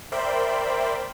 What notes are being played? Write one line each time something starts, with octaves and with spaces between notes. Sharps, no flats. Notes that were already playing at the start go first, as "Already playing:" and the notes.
A#4 C5 D5 E5 G5 B5